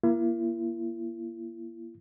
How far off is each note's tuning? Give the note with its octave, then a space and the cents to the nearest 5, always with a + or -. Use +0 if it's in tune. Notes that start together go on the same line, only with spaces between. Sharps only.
A#3 +20 E4 +40